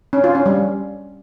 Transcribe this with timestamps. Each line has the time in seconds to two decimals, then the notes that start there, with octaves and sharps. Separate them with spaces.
0.13 C#4
0.24 F4
0.35 C#4
0.46 G3